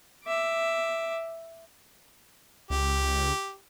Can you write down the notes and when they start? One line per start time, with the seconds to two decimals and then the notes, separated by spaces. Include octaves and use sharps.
0.25 E5 D6
2.70 C#2 G4